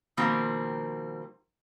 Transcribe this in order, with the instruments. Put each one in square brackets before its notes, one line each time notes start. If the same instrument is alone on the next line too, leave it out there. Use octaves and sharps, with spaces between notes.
[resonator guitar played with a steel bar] B2 D#3 F3 G3 A#3 C4